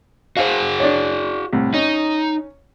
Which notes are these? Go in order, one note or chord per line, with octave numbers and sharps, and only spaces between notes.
F#4 G#4 C5 F5
D4 C#5
C2 A2
C#4 D#4